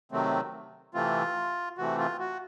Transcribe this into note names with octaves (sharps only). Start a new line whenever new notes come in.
C3 D#3 F#3 A3 C4
C3 E3 A3 C4 F4
C3 E3 A3 C4 F#4
F4
F#4